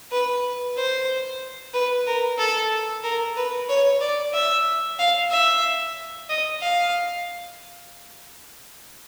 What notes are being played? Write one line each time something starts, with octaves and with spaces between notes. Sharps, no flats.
B4
C5
B4
A#4
A4
A#4
B4
C#5
D5
E5
F5
E5
D#5
F5